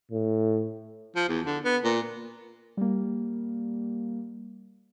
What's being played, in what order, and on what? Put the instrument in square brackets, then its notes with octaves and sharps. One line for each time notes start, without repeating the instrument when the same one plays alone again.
[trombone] A2
[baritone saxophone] F3
E2
D3
B3
A#2
[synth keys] G3 A#3